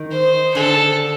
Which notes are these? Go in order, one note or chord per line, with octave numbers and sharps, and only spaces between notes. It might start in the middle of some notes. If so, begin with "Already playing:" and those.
Already playing: D#3
C5
D3 A4